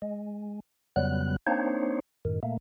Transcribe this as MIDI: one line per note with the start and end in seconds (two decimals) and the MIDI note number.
0.02 0.60 56
0.96 1.36 41
0.96 1.36 49
0.96 1.36 54
0.96 1.36 55
0.96 1.36 59
0.96 1.36 90
1.47 2.00 58
1.47 2.00 60
1.47 2.00 62
1.47 2.00 63
1.47 2.00 72
1.47 2.00 73
2.25 2.40 42
2.25 2.40 45
2.25 2.40 51
2.43 2.57 46
2.43 2.57 57
2.43 2.57 58